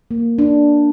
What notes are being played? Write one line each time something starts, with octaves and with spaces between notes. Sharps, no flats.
A#3
D4